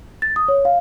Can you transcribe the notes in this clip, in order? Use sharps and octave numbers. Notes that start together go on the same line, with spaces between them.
A6
D#6
C#5
F5